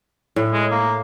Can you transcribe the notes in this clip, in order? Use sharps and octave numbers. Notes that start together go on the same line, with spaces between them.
A2
G#3
A#3